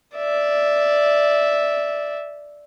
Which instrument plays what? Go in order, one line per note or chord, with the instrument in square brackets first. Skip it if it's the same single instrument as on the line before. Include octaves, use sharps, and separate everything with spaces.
[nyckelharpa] D5 E5